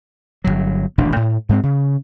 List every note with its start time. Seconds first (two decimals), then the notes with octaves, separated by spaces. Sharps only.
0.44 G1 C#2 F#3
0.98 D#1 A1 B2 D4
1.16 A2
1.49 G#2 G#3 C4
1.63 C#3